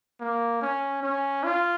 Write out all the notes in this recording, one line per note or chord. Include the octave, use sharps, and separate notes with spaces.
A#3
C#4
C#4
F4